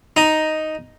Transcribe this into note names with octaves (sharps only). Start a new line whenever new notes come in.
D#4